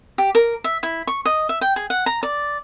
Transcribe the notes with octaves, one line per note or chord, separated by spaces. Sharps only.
G4
A#4
E5
E4
C#6
D#5
E5
G5
G#4
F#5
A#5
D5